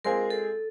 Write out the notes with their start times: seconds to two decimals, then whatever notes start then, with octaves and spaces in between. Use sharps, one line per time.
0.04 G#3 C4 F4 G#4 A#4
0.30 A4